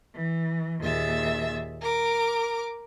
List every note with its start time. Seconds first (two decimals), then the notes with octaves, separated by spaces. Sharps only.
0.12 E3
0.79 D#2 A#2 G#4 E5 A6
1.80 A#4 D6